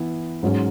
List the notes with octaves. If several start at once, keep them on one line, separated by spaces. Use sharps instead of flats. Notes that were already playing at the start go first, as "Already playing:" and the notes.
Already playing: E3 B3 E4
G#2 F#3 C#4